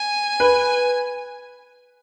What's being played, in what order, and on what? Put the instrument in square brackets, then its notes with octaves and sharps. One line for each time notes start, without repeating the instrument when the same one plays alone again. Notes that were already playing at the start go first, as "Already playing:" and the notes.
Already playing: [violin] G#5
[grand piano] B4